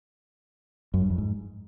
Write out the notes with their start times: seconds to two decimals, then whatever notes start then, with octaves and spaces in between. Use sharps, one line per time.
0.94 F#2
1.02 G2
1.10 F2
1.18 G#2